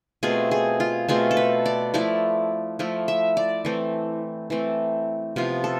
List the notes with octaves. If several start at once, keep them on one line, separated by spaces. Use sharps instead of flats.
B2 A3 C4 F4 G#4
G#4
F4
B2 A3 C4 F4 G#4
A4
B4
D5
F3 A3 E4 D5
F3 A3 E4
E5
D5
E3 A3 C4
E3 A3 C4
C3 F3 B3 F4
A4